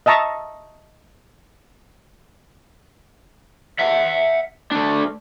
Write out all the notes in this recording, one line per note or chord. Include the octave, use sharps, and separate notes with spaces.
D#5 E5 A5 A#5 C#6
E5 F#5
A3 D4